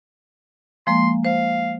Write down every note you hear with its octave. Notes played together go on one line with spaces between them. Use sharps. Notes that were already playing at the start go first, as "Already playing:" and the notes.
F3 G#3 A#3 C6
C5 F5